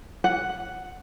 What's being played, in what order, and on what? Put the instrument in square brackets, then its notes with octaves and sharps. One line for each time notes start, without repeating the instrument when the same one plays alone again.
[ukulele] F#5